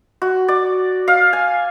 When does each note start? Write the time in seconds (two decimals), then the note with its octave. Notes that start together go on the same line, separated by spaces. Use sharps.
0.22 F#4
0.48 D5
1.08 F5
1.33 G#5